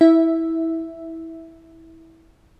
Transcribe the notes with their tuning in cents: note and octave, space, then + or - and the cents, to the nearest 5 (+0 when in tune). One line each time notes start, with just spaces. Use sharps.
E4 -15 E5 +0